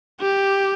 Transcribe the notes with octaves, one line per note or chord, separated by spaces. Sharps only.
G4